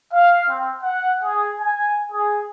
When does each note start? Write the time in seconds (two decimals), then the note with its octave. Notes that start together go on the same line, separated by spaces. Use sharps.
0.13 F5
0.50 C4
0.83 F#5
1.23 G#4
1.60 G#5
2.12 G#4